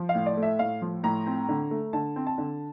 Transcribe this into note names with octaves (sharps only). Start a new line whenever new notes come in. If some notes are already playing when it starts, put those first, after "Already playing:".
Already playing: F3
F5
A2
D5
A3
E5
A2 F5
F3
A2 A#5
C4
D3
A3
D3 A5
C4
A5
D3